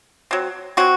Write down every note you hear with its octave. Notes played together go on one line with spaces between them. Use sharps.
F#3 C4
F#3 C4 F#4